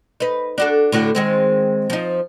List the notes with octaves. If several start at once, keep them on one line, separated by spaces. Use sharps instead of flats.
D#4 B4
D4 F#4 A4
A2 D3 F#4
D#3 G#3 C4
F3 D#4